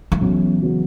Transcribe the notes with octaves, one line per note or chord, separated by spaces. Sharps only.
E3
B1 B2 F#3 C#4 F#4
C#3 F#3 B3 F#4